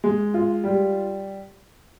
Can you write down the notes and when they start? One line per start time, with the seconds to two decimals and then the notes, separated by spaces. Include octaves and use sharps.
0.04 G#3
0.34 F4
0.64 G3